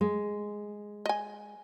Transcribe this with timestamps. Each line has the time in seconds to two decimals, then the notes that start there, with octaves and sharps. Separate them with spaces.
0.01 G#3
1.06 D#5 G#5